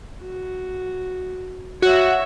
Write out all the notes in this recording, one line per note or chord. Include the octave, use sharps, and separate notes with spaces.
F#4
F#4 C#5 E5